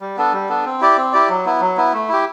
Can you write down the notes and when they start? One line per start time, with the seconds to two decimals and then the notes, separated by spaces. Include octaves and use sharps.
0.01 G3
0.17 B3 D4 A4
0.33 G3
0.49 B3 D4 A4
0.65 C4
0.81 E4 G4 D5
0.97 C4
1.13 E4 G4 D5
1.29 F#3
1.45 B3 E4
1.61 F#3
1.77 B3 E4
1.94 A3
2.09 E4 G4